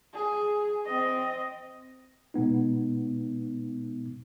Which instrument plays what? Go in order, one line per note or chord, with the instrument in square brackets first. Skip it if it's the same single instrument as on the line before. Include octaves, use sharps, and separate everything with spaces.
[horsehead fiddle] G#4
C4 D#5
[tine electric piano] B2 G#3 B3 D#4